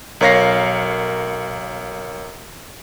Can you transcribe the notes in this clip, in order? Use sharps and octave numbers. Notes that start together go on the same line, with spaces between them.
B1 A#4 C#5 F5 A#6 C7